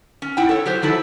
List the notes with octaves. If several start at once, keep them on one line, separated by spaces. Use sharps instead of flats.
C#4
E4 F#5 G5
A4 C#5
F#3 G4 C5
E3 F#3 E4 A4